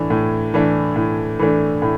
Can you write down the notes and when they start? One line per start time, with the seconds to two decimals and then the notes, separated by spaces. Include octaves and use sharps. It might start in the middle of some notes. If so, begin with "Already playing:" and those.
Already playing: A2 E3 A3 D4
0.10 A2
0.54 E3 A3 D4
0.96 A2
1.39 E3 A3 D4
1.82 A2